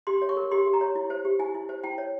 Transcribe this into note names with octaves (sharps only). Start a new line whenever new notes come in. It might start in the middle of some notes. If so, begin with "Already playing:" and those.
G4 C6
C#5
C#6
A#4
G4 C6
G4
A#5
C#5
E4
C5
G4
E4 G#5
E4
C5
E4 G5
C#5